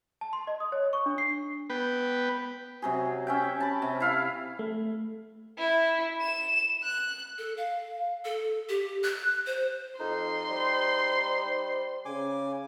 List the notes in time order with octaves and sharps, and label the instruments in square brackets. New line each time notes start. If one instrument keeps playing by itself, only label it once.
[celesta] A5
C6
D#5
D#6
C#5
C#6
D4
C7
[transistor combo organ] B3 B4 G5
[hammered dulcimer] C3 F#3 G#4
C#4 E5 G5
A5 B5
C3
E4 F5
[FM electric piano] A3
[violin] E4
E7
F#6
[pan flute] A4
F5
A4
G4
F#6
C5
[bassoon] F2 [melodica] D#4 [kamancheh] C6
[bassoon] G3 [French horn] C5
[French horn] C#3 [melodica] G#5 D6